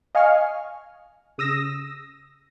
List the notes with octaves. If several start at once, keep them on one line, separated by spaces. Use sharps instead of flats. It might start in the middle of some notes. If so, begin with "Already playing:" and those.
D#5 F5 G#5 C#6 F6
C#3 D#6 E6 A#6